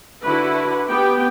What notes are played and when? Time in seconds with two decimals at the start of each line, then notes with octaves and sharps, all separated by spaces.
0.24 D3 E4 F#4 B4
0.88 B3 G4 G5